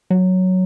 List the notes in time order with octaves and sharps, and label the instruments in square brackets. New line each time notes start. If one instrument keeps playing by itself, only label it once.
[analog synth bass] F#3